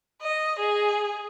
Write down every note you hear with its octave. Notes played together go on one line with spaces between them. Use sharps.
D#5
G#4